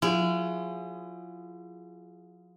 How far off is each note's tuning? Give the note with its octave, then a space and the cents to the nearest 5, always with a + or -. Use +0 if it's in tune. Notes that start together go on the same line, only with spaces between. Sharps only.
F3 +40 E4 +45 G#4 +0